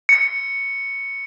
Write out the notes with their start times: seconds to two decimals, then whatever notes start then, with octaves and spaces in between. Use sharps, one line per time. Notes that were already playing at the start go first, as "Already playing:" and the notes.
0.09 C#7